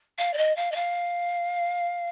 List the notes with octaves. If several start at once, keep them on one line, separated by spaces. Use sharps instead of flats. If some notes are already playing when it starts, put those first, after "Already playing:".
F5
D5
D#5
F5
D#5
F5